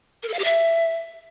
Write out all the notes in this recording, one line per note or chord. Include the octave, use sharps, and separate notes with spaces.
A#4
A4
F5
G4
E5